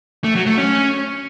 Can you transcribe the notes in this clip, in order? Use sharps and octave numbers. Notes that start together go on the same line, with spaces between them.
A3
F#3
A3
C#4